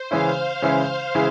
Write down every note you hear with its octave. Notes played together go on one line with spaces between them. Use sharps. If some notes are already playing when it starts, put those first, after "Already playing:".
Already playing: C5
C#3 E3 G#3 C#4 E4 F5
C#3 E3 G#3 C#4 E4
C#3 E3 G#3 E4